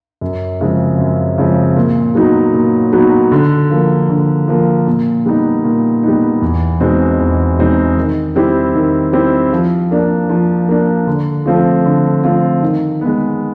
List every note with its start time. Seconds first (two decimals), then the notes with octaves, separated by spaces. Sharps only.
0.21 F#2
0.61 C#3 F3 G#3 C4
0.99 F#2
1.38 C#3 F3 G#3 C4
1.77 A#2
2.15 F#3 B3 D#4 F#4
2.54 A#2
2.92 F#3 B3 D#4 F#4
3.32 D3
3.70 F3 A#3
4.09 D3
4.48 F3 A#3
4.87 A#2
5.26 G3 B3 D#4
5.65 A#2
6.03 G3 B3 D#4
6.42 E2
6.80 B2 G#3 C4 D#4
7.20 E2
7.59 B2 G#3 C4 D#4
7.97 D#3
8.35 G3 C4 E4 G4
8.75 D#3
9.13 G3 C4 E4 G4
9.52 F3
9.91 A#3 D4
10.29 F3
10.68 A#3 D4
11.07 D3
11.46 F3 A3 C4 F4
11.85 D3
12.24 F3 A3 C4 F4
12.62 D#3
13.01 G#3 B3